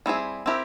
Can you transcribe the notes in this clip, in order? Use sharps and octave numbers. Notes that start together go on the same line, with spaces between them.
G3 C4 E4 G#4
C4 E4 G4 A#4